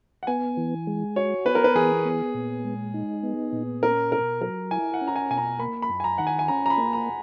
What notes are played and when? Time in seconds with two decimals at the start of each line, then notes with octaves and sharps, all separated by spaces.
0.23 F#5
0.27 B3 G#5
0.57 E3
0.87 G#3
1.16 F#4 C#5
1.45 B3 B4
1.55 A#4
1.64 B4
1.75 E3 G#4
2.05 B3
2.34 A#2
2.64 G#3
2.94 D#4
3.23 B3
3.53 A#2
3.83 C#4 A#4
4.12 B2 A#4
4.41 F#3 A#4
4.71 E4 G#5
4.94 F#5
5.01 C#4
5.08 A#5
5.16 G#5
5.30 B2 G#5
5.38 A#5
5.59 A#3 B5
5.82 B5
5.89 F#2
6.00 G#5
6.04 A#5
6.18 D#3 F#5
6.27 G#5
6.39 G#5
6.48 C#4 A#5
6.66 A#5
6.70 B5
6.78 A#3
6.93 A#5